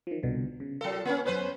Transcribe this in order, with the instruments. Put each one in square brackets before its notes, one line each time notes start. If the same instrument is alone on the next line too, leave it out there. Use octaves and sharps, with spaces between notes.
[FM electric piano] D#3 F3
C2 B2 D3
C#3
[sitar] F#3 A4 [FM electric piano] F4 A#4 C#7
[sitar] A#3 C#4
[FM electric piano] F#2 B3 [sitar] C#4 B4 C5